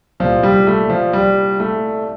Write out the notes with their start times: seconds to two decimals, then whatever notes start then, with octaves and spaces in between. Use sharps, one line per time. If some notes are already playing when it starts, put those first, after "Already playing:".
0.20 C2 A#2 F3
0.43 G3
0.67 A3
0.90 F3
1.13 G3
1.60 A3